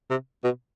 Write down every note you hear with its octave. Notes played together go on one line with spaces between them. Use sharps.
C3
B2